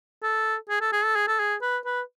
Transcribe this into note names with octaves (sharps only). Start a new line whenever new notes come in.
A4
G#4
A4
G#4
A4
G#4
A4
G#4
B4
B4